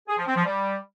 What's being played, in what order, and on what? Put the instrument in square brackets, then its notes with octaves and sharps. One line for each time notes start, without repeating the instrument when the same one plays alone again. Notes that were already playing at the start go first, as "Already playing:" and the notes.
[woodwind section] G#4
F3
C4
F3
G3